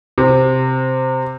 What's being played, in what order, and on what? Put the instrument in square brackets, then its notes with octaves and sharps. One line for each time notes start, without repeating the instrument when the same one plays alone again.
[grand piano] C3